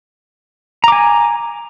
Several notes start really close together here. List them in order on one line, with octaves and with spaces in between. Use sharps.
A#5 D6 G#5